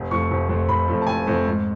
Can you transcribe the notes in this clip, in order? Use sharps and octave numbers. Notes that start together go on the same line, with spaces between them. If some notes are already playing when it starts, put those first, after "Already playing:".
Already playing: F1
F2 F3 A3 C#6
F1
F2 F3 A3
F1 B5
F2 F3 A3
A5
F1 G#5
F2 F3 A3
G#2